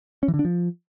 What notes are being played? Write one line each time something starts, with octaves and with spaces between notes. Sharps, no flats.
C#4
E3
D3
D4
F3